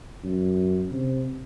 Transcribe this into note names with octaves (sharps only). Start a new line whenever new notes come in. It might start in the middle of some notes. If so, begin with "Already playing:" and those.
F#2
C3